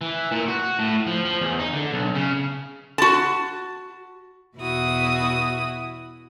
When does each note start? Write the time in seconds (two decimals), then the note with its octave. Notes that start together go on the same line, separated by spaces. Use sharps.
0.01 E3
0.32 A#2
0.48 F#4
0.79 A2
1.07 F3
1.25 F3
1.41 E2
1.59 D#4
1.73 D3
1.92 B1
2.15 C#3
2.98 F#4 A5
4.59 E2 B2 E4 F#4 D#6